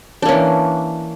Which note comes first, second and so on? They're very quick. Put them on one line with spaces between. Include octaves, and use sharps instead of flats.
D4 A#3 C#4 E3